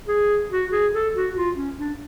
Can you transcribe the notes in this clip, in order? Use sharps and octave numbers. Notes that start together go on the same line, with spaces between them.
G#4
F#4
G#4
A4
F#4
F4
C#4
D4